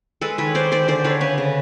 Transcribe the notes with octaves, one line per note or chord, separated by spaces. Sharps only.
G#3 A4 B4
D#3 B4 C#5
D#3 C5 D5
D#3 C5 D5
D3 C5 D5
D3 B4 C#5
C#3 B4 C#5
C#3